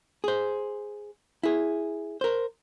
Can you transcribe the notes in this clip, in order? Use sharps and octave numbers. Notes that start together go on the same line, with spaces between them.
G#4 C5
E4 G#4
A#4 C5